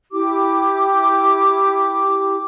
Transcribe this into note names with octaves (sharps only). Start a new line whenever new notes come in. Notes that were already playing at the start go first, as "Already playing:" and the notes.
E4 G4 D6